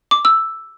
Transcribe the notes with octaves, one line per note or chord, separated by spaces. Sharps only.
D6
E6